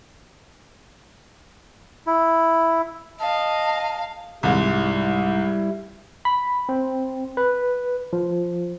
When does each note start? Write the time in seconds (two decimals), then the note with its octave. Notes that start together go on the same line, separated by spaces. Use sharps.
2.07 E4
3.20 D#5 F5 A5
4.43 C2 G#2 G3 E4
6.25 B5
6.69 C4
7.37 B4
8.13 F3